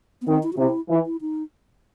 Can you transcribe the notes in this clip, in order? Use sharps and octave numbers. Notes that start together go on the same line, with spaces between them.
B3
D#3 C4
E4
F#4
C3 E4
E3
E4
D#4